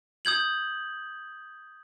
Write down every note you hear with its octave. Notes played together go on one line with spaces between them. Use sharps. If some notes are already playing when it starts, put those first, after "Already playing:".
D#6 G6 G#6 F#7